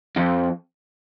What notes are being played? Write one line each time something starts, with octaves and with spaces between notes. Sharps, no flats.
F2